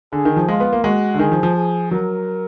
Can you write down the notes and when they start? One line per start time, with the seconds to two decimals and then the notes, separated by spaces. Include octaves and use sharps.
0.13 D3 G#4
0.25 D#3
0.36 F3
0.48 G#3 F4
0.60 B3
0.73 A#3
0.84 G#3 F#4
1.14 D3
1.19 D#3 G#4
1.32 F3
1.43 F3
1.55 G#4
1.91 F#3 A#4